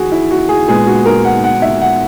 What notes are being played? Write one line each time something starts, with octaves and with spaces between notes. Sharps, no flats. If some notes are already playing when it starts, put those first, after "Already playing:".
Already playing: E3 F#4 G#4
E4
F#4
G#4
A#2 G#3 B3 G#4
F#4
A#4
F#5
F#5
E5
F#5